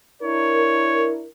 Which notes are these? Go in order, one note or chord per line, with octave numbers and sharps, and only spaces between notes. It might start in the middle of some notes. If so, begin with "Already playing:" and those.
D4 E4 A#4 C#5